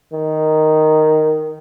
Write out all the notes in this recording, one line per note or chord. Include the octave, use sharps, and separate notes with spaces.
D#3